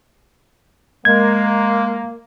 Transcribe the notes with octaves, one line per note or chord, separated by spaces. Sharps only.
G#3 A#3 G#6